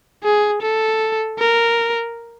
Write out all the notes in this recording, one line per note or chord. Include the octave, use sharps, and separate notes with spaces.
G#4
A4
A#4